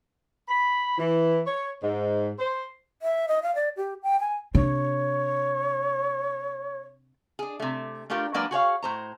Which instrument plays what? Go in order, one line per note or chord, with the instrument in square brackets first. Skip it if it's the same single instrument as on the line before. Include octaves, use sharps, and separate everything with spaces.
[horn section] B5
E3
C#5
G#2
C5
[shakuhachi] E5
D#5
F5
D5
G4
G5
G#5
[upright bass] C3 D4 [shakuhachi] C#5
[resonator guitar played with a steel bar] D4 G#4
C3 A3
A3 D4 F4 G4 A#4
F#3 G#3 A#3 D4 B4 D5
F#4 G#4 C#5 F5
A2 C5 A#5